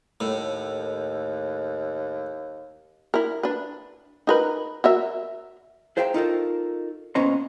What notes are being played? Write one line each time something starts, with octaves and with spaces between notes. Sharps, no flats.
D#2 A2
E4 A#4
D4 B4
D#4 A#4 B4
F#4 A#4 E5
G#4 C5 E5 F5 G5 A#5
D#4 F4 A4 A#4
A#2 B3 C#4 C5 D#5 A#5